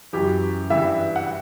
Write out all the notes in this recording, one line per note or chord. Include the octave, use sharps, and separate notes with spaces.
F#2 E3 G4
G2 E3 E5
F#5